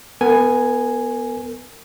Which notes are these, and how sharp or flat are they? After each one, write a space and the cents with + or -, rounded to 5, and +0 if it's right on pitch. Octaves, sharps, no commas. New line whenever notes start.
B3 +0 A#4 -40 G#5 +0